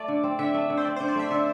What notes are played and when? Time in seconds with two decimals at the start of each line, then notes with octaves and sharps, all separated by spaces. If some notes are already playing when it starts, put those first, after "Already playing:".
Already playing: A3 D5
0.08 D3
0.24 C4
0.39 D3 E5
0.54 A3
0.70 D3
0.77 C5
0.85 C4 D5
0.96 D3 C5
1.08 D5
1.16 A3 E5
1.31 D3 D5